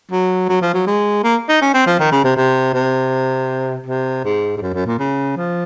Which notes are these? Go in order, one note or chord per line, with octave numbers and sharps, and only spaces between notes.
F#3
F#3
F3
F#3
G#3
A#3
D#4
C#4
C4
F3
D#3
C#3
C3
C3
C3
C3
G#2
G#2
F#2
F#2
A#2
C#3
F3